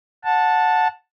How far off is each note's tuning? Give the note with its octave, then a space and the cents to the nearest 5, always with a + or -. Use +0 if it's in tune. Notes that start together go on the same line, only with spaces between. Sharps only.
F#5 -20 A5 +0